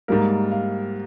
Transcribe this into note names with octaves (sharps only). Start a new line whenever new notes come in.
G#2 G3 A#3 A#4
F5